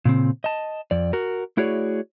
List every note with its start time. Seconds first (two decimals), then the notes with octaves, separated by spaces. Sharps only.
0.05 A#2 C#3 C4
0.44 D#5 A5
0.91 F2 D5
1.13 F#4 A#4
1.57 A3 E4 F#4 G#4 C#5 D5